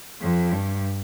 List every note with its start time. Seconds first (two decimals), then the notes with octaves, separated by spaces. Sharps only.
0.21 F2
0.52 G2